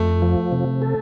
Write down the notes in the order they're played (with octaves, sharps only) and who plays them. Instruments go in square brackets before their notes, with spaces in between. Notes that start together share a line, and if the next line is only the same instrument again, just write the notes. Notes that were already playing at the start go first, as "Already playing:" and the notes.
Already playing: [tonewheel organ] F2 [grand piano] A3
[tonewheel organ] F3
C3
A4